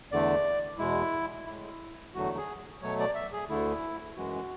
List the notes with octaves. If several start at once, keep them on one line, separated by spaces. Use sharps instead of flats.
E2 D3 A3 D5
E2 B2 G#3 E4
A2 G#3 E4
E2 D3 F#3 A3 F#4
G#4
B2 F#3 A3 C#5
D5
E5
G#4
D2 D3 A3 E4
F#2 E3 G#3 F#4